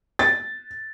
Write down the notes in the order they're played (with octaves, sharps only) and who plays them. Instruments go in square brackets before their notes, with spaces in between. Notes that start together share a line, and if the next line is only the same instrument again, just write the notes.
[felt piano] A6